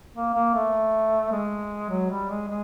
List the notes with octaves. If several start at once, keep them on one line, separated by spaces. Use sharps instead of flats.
A#3
A#3
A3
G#3
F#3
G3
G#3
G#3